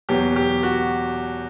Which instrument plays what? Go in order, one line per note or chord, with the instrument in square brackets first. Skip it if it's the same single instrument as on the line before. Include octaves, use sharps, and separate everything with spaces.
[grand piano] E2 B2 F#3 G4
G4
F#4